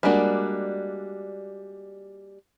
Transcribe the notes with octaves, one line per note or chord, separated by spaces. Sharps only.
G3 G#3 A#3 D4 F#4